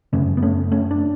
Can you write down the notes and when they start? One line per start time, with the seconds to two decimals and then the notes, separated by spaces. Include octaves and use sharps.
0.13 F#2 C#3 A3 C#4
0.37 B3
0.42 A3 C#4
0.72 A3 C#4
0.91 D4